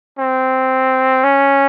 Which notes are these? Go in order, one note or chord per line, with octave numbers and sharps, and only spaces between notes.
C4
C#4